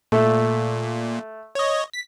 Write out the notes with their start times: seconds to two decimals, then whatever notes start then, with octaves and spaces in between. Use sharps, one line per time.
0.12 A#2 A3
1.55 C#5 D#5
1.93 B6